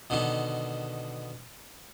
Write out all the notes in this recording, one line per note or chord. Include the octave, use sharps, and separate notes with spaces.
B2 D3 D#3